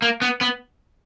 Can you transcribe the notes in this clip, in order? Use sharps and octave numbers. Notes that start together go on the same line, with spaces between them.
A#3
B3
B3